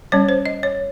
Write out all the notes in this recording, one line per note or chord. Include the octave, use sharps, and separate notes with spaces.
G3 C#4 C#5
C5
D#5
C#5